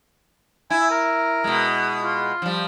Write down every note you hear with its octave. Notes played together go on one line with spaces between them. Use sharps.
E4 G#5
A#4
B2 G#3
F4
F3 G3